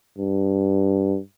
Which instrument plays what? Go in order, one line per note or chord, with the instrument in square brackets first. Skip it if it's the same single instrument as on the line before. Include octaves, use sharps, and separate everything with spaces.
[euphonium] G2